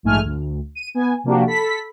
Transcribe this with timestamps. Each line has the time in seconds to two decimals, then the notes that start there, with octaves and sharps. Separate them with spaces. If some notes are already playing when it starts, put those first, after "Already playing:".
0.03 A#1 G#2 A3 G#5 F6
0.23 D2
0.75 D#7
0.95 B3 G#5
1.24 C3 F3 A#3 D4 F#4 G4
1.47 A4 B5 B6